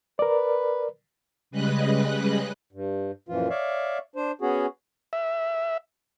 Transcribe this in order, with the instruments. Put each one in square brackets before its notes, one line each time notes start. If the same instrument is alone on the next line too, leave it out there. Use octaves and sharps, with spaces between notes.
[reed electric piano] A#4 D5 [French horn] B4
[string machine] C#3 G3 G#3 B4 D#5 F#6
[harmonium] G2
F#2 A#2 E3 F3 F4
C#5 D5 E5 F5
D4 C5
B3 C#4 F#4 G#4
[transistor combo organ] E5